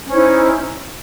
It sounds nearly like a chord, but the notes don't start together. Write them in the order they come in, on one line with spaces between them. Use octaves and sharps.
C#4 C5 E4 D#4